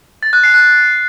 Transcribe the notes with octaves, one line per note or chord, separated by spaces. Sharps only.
A6
F#6
C7
F#6